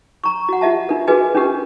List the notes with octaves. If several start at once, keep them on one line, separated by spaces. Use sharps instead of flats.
A#5 C#6
F#4 F#5
F4 G4 D#5 E5 A5
D4 A#4
F#4 G#4 A#4 B4 D#5 G#5
C#4 D4 F4 G4 A#4